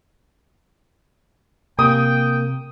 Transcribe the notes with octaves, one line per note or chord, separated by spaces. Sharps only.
C3 A#3 G5 G#5 D#6